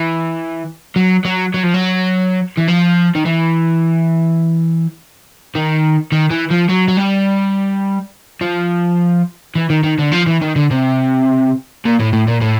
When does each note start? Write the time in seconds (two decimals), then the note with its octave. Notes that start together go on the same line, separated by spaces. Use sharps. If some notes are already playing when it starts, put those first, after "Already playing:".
Already playing: E3
0.96 F#3
1.25 F#3
1.54 F#3
1.63 F3
1.74 F#3
2.57 E3
2.68 F3
3.15 D#3
3.25 E3
5.55 D#3
6.12 D#3
6.30 E3
6.51 F3
6.69 F#3
6.88 F#3
6.97 G3
8.41 F3
9.55 E3
9.70 D#3
9.84 D#3
9.99 D3
10.12 F3
10.27 E3
10.42 D#3
10.56 D3
10.71 C3
11.85 A#2
12.00 A2
12.13 A2
12.28 A#2
12.41 A2